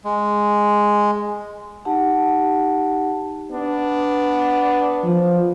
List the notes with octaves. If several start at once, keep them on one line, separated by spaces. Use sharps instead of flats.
G#3
D#4 G4 F#5 A5
B3 D4
F3